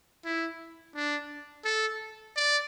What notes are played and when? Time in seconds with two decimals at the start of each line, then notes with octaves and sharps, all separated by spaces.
0.25 E4
0.95 D4
1.65 A4
2.36 D5